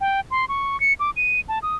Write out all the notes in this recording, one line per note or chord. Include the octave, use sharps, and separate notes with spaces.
G5
C6
C#6
C#7
D6
D#7
A5
D#6